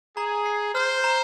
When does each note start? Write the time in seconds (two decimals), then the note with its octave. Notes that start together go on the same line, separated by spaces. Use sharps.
0.17 G#4 A#5
0.46 C7
0.75 C5 F6
1.04 A#5